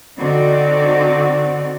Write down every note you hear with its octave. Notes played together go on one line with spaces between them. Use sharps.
D3 C4 D#4 F#4 D5